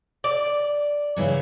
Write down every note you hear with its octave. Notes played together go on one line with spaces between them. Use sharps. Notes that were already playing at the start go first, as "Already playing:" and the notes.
D5
C#3 E3 F#3